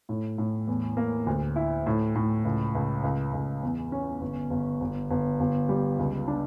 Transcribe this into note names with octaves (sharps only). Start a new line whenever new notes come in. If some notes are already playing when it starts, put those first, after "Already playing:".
A2
A2
E2
A#3
D2
E4
A2
A2
C#2
C#2
C#2
C#2
E2
C#4
G1
G1
G1
G1
G1
G3
C#2
D4